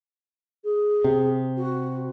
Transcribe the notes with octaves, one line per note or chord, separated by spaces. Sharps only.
G#4
C3
F#4